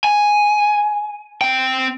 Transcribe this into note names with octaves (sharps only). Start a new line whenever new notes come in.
G#5
C4 G5